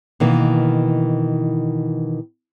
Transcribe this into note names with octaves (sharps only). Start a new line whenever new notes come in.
B2 D#3 E3 A#3